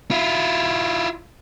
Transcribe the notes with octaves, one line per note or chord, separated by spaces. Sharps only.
E4 F4